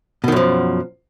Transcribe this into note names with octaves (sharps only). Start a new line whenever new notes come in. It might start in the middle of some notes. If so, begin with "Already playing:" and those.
F#2 B2 D#3 F3